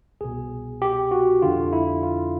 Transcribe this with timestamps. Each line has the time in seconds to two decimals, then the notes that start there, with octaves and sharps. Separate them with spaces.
0.21 C2 B2 G#4
0.82 G4
1.11 F#4
1.42 F2 D3 F4
1.73 E4
2.03 F4